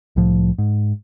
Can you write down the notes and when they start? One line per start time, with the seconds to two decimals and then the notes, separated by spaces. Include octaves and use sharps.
0.16 C2 A2 F3
0.58 G#2